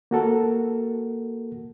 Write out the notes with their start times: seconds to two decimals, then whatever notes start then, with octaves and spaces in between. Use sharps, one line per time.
0.11 A#3 F#4 A4 A#4